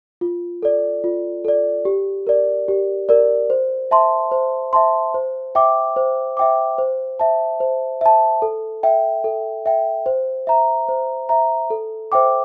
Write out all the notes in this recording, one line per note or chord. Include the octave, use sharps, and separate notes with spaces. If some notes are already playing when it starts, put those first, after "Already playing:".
F4
A4 D5
F4
A4 D5
G4
A#4 D5
G4
A#4 D5
C5
E5 A5 C6
C5
E5 A5 C6
C5
E5 G5 D6
C5
E5 G5 D6
C5
E5 A5
C5
E5 A5
A4
E5 G5
A4
E5 G5
C5
E5 A#5
C5
E5 A#5
A4
C5 E5 G5 D6